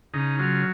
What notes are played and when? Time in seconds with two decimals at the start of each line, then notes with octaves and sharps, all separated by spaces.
0.14 C#3 D#4
0.39 F#3 F4